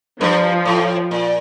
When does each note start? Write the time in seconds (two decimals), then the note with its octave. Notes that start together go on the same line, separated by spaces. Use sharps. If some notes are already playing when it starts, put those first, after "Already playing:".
0.20 G2 F3
0.65 A2
1.11 A#2